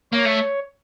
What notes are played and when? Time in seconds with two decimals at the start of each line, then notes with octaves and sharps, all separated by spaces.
0.13 A#3 C#5
0.26 A3